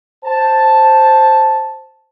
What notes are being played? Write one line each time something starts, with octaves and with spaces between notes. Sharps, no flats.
C5 A5